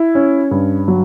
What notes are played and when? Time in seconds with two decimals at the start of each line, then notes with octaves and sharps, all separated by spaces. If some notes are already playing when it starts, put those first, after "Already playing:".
Already playing: E4
0.15 C#4
0.51 G2
0.88 F#3